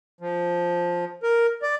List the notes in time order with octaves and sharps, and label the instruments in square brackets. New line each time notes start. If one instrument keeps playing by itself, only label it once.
[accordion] F3
A#4
D5